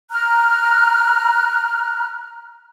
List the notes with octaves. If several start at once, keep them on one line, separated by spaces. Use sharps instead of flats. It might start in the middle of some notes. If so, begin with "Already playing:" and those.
A#5 F6 F#6